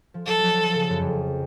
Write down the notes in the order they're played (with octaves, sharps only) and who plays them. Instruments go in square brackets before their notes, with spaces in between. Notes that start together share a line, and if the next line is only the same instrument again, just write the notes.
[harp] F3
[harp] F#3 [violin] A4
[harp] F#3
F3
C#3
F#2
F2